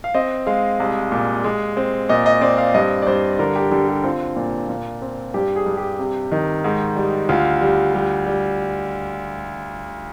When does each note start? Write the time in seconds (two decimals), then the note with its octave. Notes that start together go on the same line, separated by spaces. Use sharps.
0.04 F5
0.14 C4 D#5
0.47 G#3 F5
0.80 C2
1.12 A#2
1.44 G#3
1.77 C4
2.09 A#2 D#5
2.26 D#5
2.41 C4 D5
2.58 F5
2.74 G2 D#5
3.02 D5
3.07 G2 C5
3.39 D3 A#4
3.56 G4
3.71 D3 G4
3.89 G4
4.04 C4 F4
4.36 A#2
4.69 A#2
5.02 C4
5.34 G2 G4
5.56 G#4
5.66 G2
5.77 G4
5.99 C3
6.32 D#3
6.64 G#2
6.96 G3
7.29 D2 F4
7.61 G3
7.94 G3
8.27 G3